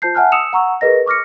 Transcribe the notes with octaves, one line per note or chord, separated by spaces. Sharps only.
F4 C5 A5 G6 C7
E5 F#5 G#5 A5 F6 F#6
D#6 E6 C#7 E7 F7
F#5 A#5 C#6 E6
G#4 A#4 B4 D#5 A#6
C#6 D6 F6 A#6 C#7